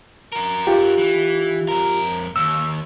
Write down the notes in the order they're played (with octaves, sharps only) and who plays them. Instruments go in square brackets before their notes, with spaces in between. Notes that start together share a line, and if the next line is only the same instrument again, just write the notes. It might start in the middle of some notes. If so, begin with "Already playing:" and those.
[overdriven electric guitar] F#4 A#4
[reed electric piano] F4 G4
[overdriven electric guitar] E3
F2 A#4
[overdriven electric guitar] D#2 [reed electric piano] E6